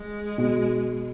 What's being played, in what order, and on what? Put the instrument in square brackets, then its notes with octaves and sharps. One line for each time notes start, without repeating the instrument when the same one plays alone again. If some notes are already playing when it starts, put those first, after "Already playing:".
Already playing: [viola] G#3
[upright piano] B2